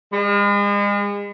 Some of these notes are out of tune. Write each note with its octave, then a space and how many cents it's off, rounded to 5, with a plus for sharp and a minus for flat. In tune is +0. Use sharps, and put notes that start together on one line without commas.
G#3 -40